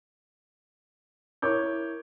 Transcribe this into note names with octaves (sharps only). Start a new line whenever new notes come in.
E4 A#4 C#5 D6 G6